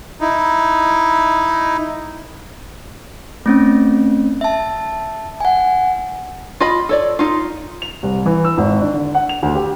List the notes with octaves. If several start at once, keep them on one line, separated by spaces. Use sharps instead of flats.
D#4 E4
A3 C4 C#4
E5 A5
F#5 G#5
F4 D#5 B5
A4 C#5 D5
D#4 F4
F7
C2
E3
E6
G#1
D4
D3
F#5
F7
D2
G4